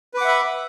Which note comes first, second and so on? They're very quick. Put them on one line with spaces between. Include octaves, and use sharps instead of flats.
B4 D6 F#5 E5 B5